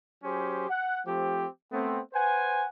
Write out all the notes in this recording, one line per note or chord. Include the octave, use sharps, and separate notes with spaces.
F#3 C#4 G4 G#4 C5
F#5
F3 A3 C4 G4
A3 B3 C4
B4 C5 F#5 G#5